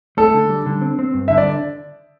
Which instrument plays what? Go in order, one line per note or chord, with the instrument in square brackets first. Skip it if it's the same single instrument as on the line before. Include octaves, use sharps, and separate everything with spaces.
[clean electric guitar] A3 [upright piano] A4
[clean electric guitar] D3
G3
D3
C4
C4
G2
[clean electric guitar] D3 [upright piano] E5
[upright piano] D5